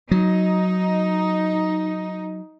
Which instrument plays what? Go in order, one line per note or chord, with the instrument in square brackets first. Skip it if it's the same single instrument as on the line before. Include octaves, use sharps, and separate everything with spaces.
[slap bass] F#3 [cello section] D#4